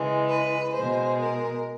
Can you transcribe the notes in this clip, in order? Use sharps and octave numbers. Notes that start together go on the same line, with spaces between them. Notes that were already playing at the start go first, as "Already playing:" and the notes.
Already playing: C#3 E3 G#3
B4
B2 G#3 C5
A#4